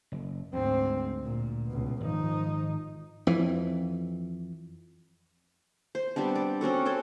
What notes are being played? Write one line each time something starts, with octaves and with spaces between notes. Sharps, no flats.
F#1
D2 G#2 C4
A#2
C#2 B2
G#1 F3 D#4
F2 E3
C5
G3 B3 C4 D4
D5
C4 C#4 F#4 A4
A4 C5 C#5